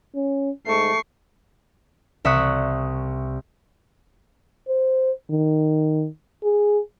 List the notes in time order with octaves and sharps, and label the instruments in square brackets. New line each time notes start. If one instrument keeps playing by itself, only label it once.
[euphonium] C#4
[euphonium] G#2 [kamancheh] A3 [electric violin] C#6 C7
[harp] C2 E5 C#6 D#6 F#6
[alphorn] C5
D#3
G#4